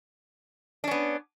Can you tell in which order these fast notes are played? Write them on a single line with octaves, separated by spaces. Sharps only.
D4 C#4 B3